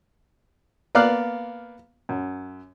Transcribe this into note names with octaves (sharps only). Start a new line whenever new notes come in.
A#3 B3 D5 F5 F6 F#6
F#2